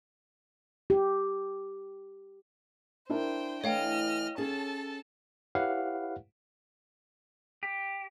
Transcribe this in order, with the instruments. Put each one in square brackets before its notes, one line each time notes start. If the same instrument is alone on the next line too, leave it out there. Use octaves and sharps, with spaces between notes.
[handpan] G4
[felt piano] D4 E4 A#4 [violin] C5 G5
[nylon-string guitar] E3 A3 [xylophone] C#5 F5 G5 [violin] D#5 F6
[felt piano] C#4 [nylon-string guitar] G#4 [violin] A4 A5
[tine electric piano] E4 G4 B4 C#5 F5 F#5
[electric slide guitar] G4